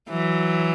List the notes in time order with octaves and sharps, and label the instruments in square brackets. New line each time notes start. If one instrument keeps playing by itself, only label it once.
[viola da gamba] E3 F#3